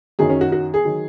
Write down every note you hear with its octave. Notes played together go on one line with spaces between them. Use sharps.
F#2 D#3 F#3 G#4
C#4
F#4
F#4
G#4
D#3 F#3